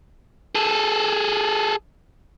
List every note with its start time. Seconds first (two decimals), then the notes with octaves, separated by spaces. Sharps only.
0.55 G#4 A4